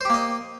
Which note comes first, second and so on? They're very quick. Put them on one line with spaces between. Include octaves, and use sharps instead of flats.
C5 G4 A#3 D#5